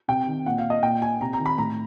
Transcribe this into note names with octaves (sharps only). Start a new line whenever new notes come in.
C3 G5
D#3
A#2 F#5
F5
D#5
A#2 G5
G#5
C3 A#5
A#5
D#3
B5
A2 A#5